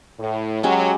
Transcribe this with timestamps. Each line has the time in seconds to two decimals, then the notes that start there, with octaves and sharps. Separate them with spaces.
0.18 A2
0.63 F#3 G#3 C#4 G4